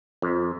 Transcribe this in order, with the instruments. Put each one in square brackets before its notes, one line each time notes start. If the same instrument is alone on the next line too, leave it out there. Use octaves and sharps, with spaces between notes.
[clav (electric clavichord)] F2